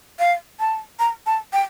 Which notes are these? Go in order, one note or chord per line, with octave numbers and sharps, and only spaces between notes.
F5
A5
A#5
A5
G5